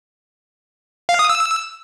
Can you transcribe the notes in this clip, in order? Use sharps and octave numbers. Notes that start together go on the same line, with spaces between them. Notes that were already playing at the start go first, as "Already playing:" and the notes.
F5
D#6
E6